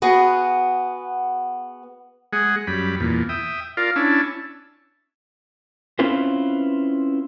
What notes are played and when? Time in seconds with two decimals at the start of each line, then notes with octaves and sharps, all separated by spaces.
0.02 B3 F#4 G#4 F#5
2.33 G#3 G#4 F#5
2.67 F#2 G3 B5
3.00 E2 A#2
3.29 E5 G5 D#6
3.77 F4 A#4 D5 F5
3.96 C#4 D4 E4 A5
5.99 C4 C#4 E4 F4 B4 C5